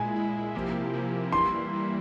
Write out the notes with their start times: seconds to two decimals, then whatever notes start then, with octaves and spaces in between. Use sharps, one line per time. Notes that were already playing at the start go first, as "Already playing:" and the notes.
Already playing: A#2 G#3 E4 G#5
0.16 A#2 G#3 E4
0.55 C3 F3 A#3 E4 G4
0.93 C3 F3 A#3 E4 G4
1.32 E3 G3 A#3 E4 C6
1.72 E3 G3 A#3 E4